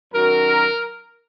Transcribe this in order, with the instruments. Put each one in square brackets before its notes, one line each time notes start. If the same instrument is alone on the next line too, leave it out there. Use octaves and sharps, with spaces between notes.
[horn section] F#2 D#3 F#3 A#4